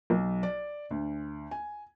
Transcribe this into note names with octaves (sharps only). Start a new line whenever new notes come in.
B1
D5
D2
G#5